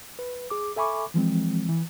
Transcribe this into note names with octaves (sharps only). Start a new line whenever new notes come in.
B4
G#4 D6
A4 E5 G#5 B5 C#6 D6
E3 F3 G#3 C4
E3